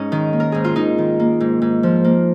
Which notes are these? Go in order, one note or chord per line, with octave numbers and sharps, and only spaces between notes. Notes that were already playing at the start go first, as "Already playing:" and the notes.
Already playing: G#2 C#4 D#4
D#3
A#3
A#4
G#2 G#4
F4
G#2 D#4
D#3
A#3
G#2
G#2
F3
A#3